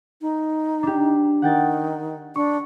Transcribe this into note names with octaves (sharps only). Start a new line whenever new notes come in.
D#4
D4 G4
D#3 F#5 G5 A6
D4 C#6